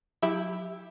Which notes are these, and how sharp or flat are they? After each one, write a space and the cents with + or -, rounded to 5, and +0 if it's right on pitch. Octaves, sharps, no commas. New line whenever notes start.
F#3 -30 E4 +0 G4 +10